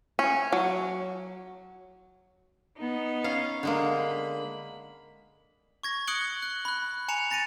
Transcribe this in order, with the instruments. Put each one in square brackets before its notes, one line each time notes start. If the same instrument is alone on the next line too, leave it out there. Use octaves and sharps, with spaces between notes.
[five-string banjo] C#4
F#3
[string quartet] B3 D#4
[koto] C#4 F5
D3 G#3 A#3
[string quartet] B5
[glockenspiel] C#6 G#6 A#6
D#6 F#6 C#7 D7 F#7 G7
F#6
B5 F#6
G#5 A#5 C#7 E7 F7
A#5 A6 A#6 C#7 D#7